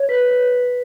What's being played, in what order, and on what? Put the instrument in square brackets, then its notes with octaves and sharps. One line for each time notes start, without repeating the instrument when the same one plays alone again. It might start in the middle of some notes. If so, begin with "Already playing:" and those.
Already playing: [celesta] C#5
B4 B6
B4
B4